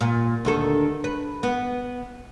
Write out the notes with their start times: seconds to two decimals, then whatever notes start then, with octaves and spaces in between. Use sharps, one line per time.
0.01 A#2
0.45 D2 D#3 A4
1.04 B4
1.43 B3